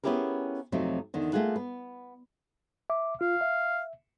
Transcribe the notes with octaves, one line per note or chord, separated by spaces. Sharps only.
B3 C#4 E4 G4 G#4 A#4
F2 C3 F#3 A3 C4 D#4
E2 D3 D#3
A3 A#3 F4 G#4 F#5
B3
E5 D6
F4 F5
E5